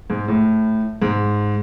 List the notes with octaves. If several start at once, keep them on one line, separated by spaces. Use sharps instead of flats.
G#2
A2
G#2